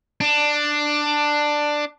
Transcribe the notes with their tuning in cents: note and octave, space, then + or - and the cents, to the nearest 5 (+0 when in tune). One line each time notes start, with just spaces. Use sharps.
D4 +10